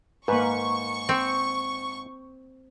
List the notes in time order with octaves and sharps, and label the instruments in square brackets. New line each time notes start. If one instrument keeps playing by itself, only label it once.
[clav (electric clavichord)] G#2 [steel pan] A#3 B4 [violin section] C#6
[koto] C4